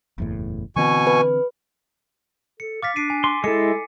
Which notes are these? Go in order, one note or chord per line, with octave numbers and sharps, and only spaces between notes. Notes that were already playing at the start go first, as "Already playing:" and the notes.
F#1 E2 A2
B2 D3 E3 C4 G#5 C#6
B4
A4 C#7
F5 D6 A6 B6
D4 C7 D7 D#7
G#5
C6 D6
G#3 E4 A4 C#7